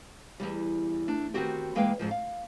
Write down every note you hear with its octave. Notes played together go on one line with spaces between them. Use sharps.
E2 G2 G3
A3 D4
D#3 G3 B3 C4 F#4 G4
E3 G#3 A#3 B4 F5 G5
F2 G#2 F3
F5